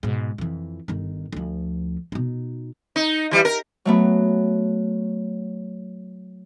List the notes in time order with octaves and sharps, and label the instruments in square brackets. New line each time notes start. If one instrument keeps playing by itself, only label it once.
[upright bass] G#2 B2
F2 E3
G1 D#3
D2 F3
B2 D#4
[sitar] D#4
E3 G3
A#4
[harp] F#3 A3 B3